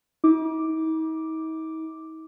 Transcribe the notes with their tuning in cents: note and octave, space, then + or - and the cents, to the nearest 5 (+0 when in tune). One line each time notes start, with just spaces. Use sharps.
D#4 +45 D6 +0